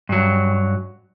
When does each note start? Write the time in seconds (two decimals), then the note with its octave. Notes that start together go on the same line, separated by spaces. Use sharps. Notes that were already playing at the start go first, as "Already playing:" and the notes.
0.09 G2 F#3